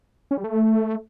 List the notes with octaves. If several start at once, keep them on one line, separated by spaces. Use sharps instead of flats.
C#4
G3
A3